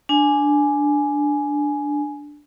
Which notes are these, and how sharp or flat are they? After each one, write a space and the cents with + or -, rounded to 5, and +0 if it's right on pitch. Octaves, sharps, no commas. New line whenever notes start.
D4 +0 G#5 +10